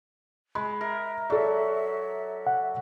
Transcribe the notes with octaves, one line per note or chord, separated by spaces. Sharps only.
G#3 B5
A#4 E5
F#3 A4 D5
F#5